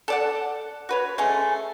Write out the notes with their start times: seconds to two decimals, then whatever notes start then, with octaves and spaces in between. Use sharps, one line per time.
0.08 A4 D5 F#5
0.89 F#4 B4 C#5
1.18 G#3 A3 C#4